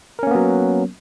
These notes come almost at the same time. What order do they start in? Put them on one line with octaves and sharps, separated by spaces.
A#4 C#4 A#3 B3 F#3